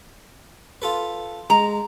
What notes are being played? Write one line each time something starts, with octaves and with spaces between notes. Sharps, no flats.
F4 A4 B4
G#3 A#5